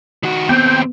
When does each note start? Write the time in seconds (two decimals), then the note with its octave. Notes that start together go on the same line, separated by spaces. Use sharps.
0.23 D#3 F#4
0.49 D#2 B3 C4 G5